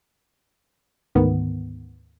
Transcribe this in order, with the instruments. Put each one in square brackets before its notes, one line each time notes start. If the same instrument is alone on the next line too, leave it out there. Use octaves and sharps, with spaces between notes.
[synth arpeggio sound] D2 G#2 D#3 B3